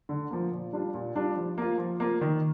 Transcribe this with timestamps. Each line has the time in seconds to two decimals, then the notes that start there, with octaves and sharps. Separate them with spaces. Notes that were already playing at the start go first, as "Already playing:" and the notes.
0.09 D3
0.31 F3 A#3
0.52 A#2
0.73 G3 D4 F4
0.94 A#2
1.16 G3 D4 F4
1.36 F3
1.58 A#3 F4
1.78 F3
2.00 A#3 F4
2.21 D#3